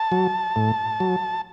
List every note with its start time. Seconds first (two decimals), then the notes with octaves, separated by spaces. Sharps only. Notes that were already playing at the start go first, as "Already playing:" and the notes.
Already playing: A5
0.12 F#3
0.56 A2
1.00 F#3